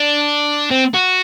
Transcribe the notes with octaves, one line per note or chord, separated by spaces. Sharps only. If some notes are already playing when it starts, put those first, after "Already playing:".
Already playing: D4
C4
F#4